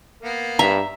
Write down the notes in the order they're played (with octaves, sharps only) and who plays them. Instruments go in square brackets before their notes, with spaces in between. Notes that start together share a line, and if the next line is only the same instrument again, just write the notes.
[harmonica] A#3 B3
[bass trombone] G2 [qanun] E5 [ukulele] A#5